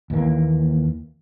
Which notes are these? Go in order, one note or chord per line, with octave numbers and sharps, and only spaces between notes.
D#2 E3 A#3